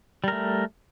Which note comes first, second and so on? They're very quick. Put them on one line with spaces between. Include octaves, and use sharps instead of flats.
G3 A#4 A3